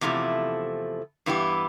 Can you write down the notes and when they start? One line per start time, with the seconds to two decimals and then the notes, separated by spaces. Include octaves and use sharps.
0.01 E2 C3 F3 A3 E4
1.26 G2 E3 B3 E4 G4